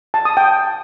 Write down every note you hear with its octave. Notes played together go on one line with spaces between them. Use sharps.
A5
D#6
G5